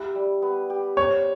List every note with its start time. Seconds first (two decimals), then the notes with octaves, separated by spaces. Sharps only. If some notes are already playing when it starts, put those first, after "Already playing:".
Already playing: B3 E4 G4
0.15 G3
0.42 B3
0.70 G4
0.97 C5 C#5